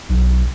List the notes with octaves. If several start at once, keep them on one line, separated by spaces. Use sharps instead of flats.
B1